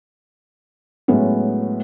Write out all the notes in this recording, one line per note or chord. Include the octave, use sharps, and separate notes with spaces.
A2 F#3 G#3 B3 C#4